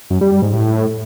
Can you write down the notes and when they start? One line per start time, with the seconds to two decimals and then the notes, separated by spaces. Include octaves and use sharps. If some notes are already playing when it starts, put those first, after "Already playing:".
0.10 F#2
0.21 G3
0.32 G3
0.42 G#2
0.53 A2